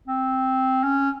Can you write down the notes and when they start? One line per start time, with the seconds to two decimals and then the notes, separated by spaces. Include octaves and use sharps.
0.08 C4
0.83 C#4